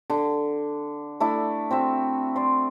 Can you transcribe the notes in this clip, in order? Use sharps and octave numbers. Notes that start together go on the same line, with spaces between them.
D3
A3 D4 E4
C4 F#4 E5
D5 C6